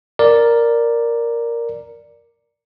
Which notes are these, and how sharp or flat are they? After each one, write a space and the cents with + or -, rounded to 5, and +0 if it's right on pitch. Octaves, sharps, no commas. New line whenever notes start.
A#4 +0 D5 +0